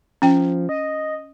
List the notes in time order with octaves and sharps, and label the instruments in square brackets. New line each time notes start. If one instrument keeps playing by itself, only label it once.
[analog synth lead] F3 [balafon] C#4 G5
[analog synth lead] D#5